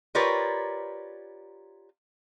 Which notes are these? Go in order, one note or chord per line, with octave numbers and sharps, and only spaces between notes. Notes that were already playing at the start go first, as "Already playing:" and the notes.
F4 G4 A#4 B4 C#5 D5